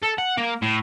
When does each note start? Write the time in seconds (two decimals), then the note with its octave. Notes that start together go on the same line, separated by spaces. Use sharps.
0.03 A4
0.18 F#5
0.38 A#3
0.62 A2